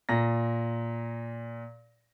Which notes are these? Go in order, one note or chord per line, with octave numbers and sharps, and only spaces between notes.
A#2 A#5 A#6